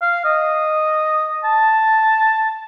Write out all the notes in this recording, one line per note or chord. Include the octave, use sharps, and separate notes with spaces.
F5
D#5
A5